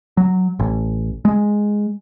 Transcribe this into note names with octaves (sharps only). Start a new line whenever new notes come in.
F#3
A1
G#3